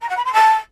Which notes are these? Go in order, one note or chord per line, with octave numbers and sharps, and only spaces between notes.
A#5
F#5
B5
C6
A5